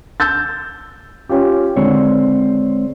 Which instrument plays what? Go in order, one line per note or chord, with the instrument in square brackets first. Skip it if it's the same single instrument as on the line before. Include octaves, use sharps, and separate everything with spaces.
[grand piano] E6 G6 A6
C#4 F4 G4
[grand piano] D3 [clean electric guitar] G#3 C4 C#5